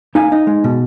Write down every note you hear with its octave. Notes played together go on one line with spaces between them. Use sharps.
D#4 F5 G#5
D#4
G#3
B2